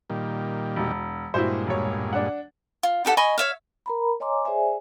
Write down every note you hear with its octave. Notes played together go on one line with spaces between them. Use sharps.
A#2 D#3 G3
E1
G2 A#2 G#3 E4 F#4 C5
E1 C#5
D4 F#5
F4
D#4 G4 A4 F#5
D#5 G#5 B5 C#6
C#5 E5 F5
A#4 A#5 B5
C#5 D#5 G#5 A#5 C6 D6
G#4 C5 D5 E5 G#5